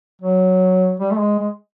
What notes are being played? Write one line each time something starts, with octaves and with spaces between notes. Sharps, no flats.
F#3
G3
A3
G#3
G#3